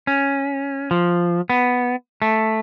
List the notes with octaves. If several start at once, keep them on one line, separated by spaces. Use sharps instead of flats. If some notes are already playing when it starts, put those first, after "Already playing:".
C#4
F3
B3
A3